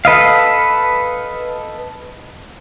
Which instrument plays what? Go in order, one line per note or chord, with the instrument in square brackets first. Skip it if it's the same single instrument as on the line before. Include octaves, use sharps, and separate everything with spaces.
[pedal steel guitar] A4 B4 D#5 F5